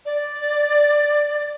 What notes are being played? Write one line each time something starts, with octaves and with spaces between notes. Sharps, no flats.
D5